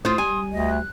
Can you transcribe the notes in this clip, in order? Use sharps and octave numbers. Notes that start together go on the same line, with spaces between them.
A2 F4 C5 C6 D#6
G3 G#5
D2 D#5
F#6